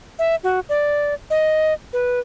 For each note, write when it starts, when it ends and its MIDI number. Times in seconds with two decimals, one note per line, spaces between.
0.19 0.35 76
0.44 0.60 66
0.69 1.14 74
1.30 1.73 75
1.93 2.19 71